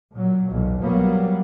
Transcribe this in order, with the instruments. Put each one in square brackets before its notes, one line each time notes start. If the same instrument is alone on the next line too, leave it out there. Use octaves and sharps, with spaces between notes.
[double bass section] A#2 F#3
B1 E2 A#2
F#3 G3 A#3 B3